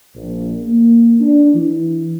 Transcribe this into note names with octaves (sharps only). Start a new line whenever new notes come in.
A#1
A#3
D4
E3